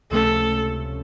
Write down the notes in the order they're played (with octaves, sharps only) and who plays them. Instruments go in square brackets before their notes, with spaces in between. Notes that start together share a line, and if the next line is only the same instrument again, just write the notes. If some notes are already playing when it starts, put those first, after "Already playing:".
[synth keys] C#2 C3 F3 A3 C#4 [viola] A4